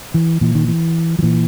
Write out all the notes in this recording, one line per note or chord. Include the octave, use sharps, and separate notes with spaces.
E3
A#2 E3
D#3
E3
F3
A#2 E3